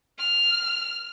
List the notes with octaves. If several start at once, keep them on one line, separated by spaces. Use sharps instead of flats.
F6